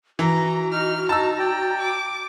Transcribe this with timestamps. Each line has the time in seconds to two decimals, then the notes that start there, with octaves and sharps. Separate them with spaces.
0.19 E3 F#4 A#5
0.72 D#4 F6
1.09 D#4 A5 A#5 E6
1.39 D5 G5
1.80 D6